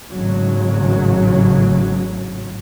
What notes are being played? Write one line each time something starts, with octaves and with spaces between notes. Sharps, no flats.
G#1 A2 C#3 F#3